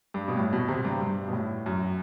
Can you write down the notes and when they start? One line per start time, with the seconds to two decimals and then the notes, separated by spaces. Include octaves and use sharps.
0.14 G2
0.28 B2
0.36 A2
0.53 B2
0.69 C3
0.85 G2
1.01 G2
1.28 B2
1.33 A2
1.66 F#2